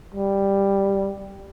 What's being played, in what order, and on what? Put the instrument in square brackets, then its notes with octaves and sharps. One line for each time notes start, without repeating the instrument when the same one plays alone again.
[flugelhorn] G3